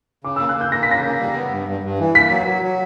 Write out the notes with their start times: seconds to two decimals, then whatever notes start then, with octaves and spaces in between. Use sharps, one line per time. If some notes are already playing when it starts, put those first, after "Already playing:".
0.24 C#3 D6
0.36 A#3 E6
0.49 F#6
0.57 A#3 G6
0.72 A#3 A#6
0.83 B6
0.88 C#3 A#6
1.05 A#3
1.20 G3
1.36 B3
1.51 G2
1.68 G2
1.83 G2
1.99 E3
2.15 A#3 B6
2.30 F#3
2.46 F#3
2.63 F#3